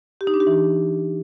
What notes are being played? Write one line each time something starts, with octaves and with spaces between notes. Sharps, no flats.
G4
D#4
D4
G4
E3